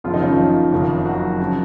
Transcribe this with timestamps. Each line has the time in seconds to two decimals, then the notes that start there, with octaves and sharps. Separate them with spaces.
0.04 F#1 F#2 C#3 F3 F4
0.14 D#3 D#4
0.22 C#3 C#4
0.29 F3 F4
0.72 F#1 F2 D#3
1.05 F#3 F#4
1.40 C#3 F3